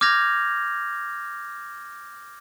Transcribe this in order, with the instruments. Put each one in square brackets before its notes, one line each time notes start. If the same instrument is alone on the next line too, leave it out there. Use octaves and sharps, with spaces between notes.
[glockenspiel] D6 F6 G6 G#6 A#6 F7